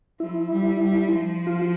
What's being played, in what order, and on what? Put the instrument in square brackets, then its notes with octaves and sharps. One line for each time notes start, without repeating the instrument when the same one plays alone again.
[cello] F3 [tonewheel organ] E4
[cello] G3
G3
F3
[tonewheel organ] F4